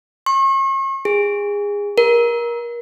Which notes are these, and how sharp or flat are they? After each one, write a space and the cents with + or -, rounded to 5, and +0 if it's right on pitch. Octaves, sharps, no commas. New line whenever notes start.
C#6 -40
G#4 -25
A#4 +25